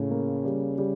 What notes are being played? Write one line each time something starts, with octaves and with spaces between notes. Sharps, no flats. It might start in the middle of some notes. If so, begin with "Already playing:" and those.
Already playing: A2 C#3
A#3
G3
G3